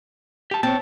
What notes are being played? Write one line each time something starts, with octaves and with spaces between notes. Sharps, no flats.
G4 A5
C4 C#5 A5